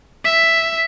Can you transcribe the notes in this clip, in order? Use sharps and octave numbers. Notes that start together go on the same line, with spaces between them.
E5 B6